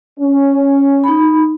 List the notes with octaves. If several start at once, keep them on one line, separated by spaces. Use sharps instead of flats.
C#4
D#4 B5